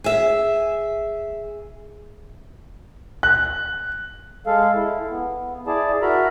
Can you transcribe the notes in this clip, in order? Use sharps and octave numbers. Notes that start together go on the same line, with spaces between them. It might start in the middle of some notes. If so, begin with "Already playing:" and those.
G#4 E5
F#6
G#3 A4 F5
E4
B3
E4 G#4 D5 A5
F#4 A#4 E5 A#5 B5